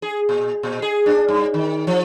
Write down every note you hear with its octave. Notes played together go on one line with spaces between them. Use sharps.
G#4
A#2
A#2
G#4
D4
G2
D#3
F3